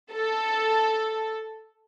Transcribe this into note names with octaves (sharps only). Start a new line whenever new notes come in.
A4